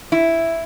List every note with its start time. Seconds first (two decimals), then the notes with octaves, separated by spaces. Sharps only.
0.12 E4